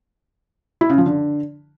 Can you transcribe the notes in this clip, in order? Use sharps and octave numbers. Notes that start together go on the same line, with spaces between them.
E4
C#3
F3
D3